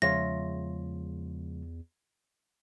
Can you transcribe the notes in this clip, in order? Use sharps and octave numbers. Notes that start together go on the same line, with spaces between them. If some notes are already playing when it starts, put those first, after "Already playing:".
E2 C#3 F3 G#3 F4 C#5 E5 A#6